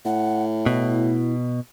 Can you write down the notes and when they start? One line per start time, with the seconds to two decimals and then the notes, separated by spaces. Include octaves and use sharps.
0.05 A2 F#5
0.66 B2 E4